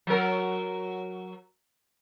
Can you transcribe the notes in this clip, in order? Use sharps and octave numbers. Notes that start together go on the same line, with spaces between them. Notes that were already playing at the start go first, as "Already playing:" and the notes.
F#3 A#4